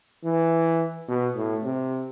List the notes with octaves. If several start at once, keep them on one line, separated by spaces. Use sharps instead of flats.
E3
B2
A2
C3